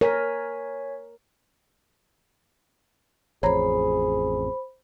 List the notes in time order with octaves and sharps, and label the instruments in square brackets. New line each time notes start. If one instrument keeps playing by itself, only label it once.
[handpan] A#4 [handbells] C#5 G#5 B6
[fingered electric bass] A1 F2 [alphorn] G#4 [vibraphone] C5 B5 [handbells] C#5 A#5